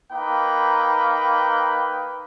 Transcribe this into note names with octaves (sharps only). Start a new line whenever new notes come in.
A#3 D#4 B4 G5